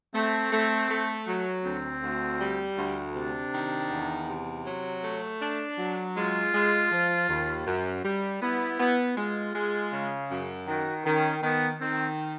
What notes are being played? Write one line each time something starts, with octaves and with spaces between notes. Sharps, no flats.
A3 C4
A3
A3
F#3
D2 C4
D2
G3
D2
C3 D4
D#3
E2
C3
F#3
A3
D4
F#3
G#3 F4
G#3
F3
D#2
F#2
G3
B3 E4
B3
G#3 F4
G#3
C#3
F#2
D#3 F#4
D#3 C#4
D#3 B3
D#3 C4